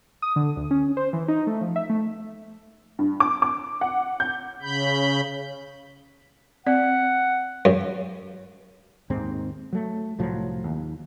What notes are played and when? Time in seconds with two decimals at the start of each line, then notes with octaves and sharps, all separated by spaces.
0.22 D#6
0.36 D3
0.56 D2
0.71 C#4
0.97 C5
1.13 E3
1.28 D#4
1.47 A3
1.61 F3
1.76 E5
1.90 A3
2.99 G2
3.20 D6
3.42 D6
3.81 F#5
4.20 G6
4.63 C#3 B5 G6
6.66 C4 D5 F#5
7.65 F#2
9.10 D#2 G#2 D#3 C4
9.73 F#3 A3
10.18 C2 A2 F3 F#3
10.64 D#2